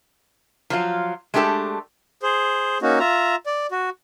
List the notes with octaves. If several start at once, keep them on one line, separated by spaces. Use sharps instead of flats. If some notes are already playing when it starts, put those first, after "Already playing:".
F3 F#3 F4
G#3 A3 D4 G4 A4
G#4 C5
A#3 C#4 D#4 F#4
F4 E5 A#5
D5
F#4